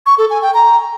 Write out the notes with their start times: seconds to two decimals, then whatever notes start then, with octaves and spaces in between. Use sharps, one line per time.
0.06 C#6
0.18 A4
0.30 G#5
0.42 G5
0.54 A#5